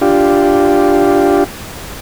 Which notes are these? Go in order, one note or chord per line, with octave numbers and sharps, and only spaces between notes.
D4 F4 G4